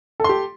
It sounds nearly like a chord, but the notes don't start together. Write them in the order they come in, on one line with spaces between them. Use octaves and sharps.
A4 C6 G4